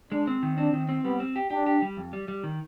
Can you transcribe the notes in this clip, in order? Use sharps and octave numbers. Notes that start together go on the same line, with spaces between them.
G#3 D4
C4
D#3
C4 D4
D#3
C4
G3 B3
C4
G4
D4 G4
G4
G3
F2
G3
G3
D#3